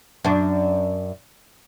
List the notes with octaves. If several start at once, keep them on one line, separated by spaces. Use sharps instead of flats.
F#2 D4